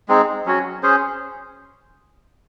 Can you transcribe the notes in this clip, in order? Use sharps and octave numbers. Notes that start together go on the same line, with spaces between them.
G#3 C4 D#4 G#4
F#3 C#4 F#4 C#5
C#4 G#4 C5